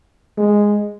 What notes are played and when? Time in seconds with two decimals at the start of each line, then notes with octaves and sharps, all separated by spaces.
0.38 G#3